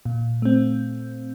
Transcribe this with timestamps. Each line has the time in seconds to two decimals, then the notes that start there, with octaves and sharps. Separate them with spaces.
0.05 A#2
0.42 A3 C4